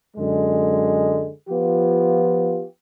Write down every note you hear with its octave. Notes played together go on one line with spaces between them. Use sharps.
F#2 D3 G#3
F3 B3 F4 G4